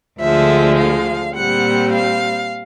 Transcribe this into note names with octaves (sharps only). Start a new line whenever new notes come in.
D2 D3 F3 G#3 E5
F5
A#2 G3 C4 F#5
F5